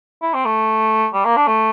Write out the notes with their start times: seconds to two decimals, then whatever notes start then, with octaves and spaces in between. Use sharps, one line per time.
0.22 E4
0.34 C4
0.45 A3
1.13 G3
1.25 A#3
1.36 D4
1.47 A3